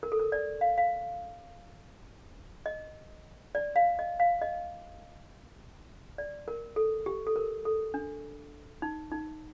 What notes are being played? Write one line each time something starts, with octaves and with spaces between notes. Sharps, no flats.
A#4
A4
A#4
D5
F5
F5
D#5
D5
F5
D#5
F5
D#5
D5
A#4
A4
G4
A4
A#4
A4
D4
D#4
D#4